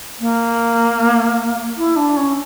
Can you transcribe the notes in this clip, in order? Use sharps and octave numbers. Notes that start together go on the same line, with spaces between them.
A#3
E4
D4
C#4